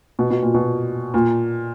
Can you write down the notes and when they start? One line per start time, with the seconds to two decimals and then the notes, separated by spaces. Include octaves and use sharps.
0.19 B2
0.31 B2
0.42 A#2
0.54 B2
1.14 A#2